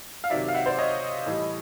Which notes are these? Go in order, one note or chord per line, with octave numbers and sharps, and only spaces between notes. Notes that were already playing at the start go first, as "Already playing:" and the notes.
F5
C3 D#3 F#3 D5 E5
F5
E5 F#5
C5 D5
C#5 D#5
A2 E3 G3